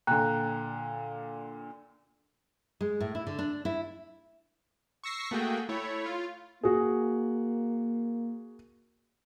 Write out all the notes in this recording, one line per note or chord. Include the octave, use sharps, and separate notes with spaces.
A#2 D3 G5 A#5 F#6
G#3
A2
E4
D3
D4
E4
C#6 E6 A#6 C7
A3 A#3 F#4 G#4 G5
A3 E4 C#5
F4
A#3 F#4 G#4